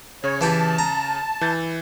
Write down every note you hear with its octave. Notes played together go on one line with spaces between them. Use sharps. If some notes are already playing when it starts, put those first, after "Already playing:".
C#3 C#5
E3 E4 G4 A5
A#5
E3 G6 A6